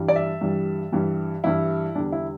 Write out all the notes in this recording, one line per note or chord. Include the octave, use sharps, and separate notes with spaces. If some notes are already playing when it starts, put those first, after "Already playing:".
Already playing: G2 E3 G3
D5
E5
G2 E3 G3
G2 E3 G3
G2 E3 G3 E4
E2 D3 G3 D4
E4